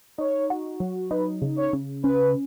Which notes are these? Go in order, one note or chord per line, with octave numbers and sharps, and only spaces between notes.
D#4 C#5
F#4
F#3
D#4 B4
C#3
C#5
C#3
C#4 B4